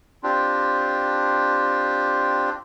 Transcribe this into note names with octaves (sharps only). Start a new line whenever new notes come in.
C4 D4 F4 G4